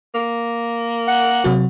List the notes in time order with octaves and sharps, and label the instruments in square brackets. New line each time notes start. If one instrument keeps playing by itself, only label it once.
[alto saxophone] A#3
[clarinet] F#5
[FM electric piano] C3 F#3 F#4